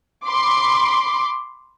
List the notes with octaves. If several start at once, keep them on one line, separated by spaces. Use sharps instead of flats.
B5 C6 D6